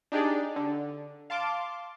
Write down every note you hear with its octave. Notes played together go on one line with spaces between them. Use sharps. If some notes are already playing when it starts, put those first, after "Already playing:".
D4 D#4 G4 G#4 D5
D3
F5 A5 C6 D6